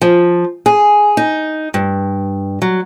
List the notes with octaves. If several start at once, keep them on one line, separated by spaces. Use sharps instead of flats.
F3
G#4
D#4
G2
F#3